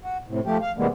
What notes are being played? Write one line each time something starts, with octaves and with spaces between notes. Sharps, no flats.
F#4
A2 C3
F3 A3 G4
F5
C3 E3 G3 G#3 A#3 B3